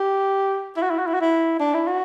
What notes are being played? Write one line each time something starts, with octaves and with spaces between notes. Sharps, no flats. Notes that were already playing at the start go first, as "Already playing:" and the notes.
Already playing: G4
E4
F#4
E4
F#4
E4
F#4
E4
D4
E4
F#4